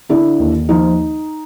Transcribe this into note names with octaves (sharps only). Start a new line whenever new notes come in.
D3 D4 E4
D#2
F3 D#4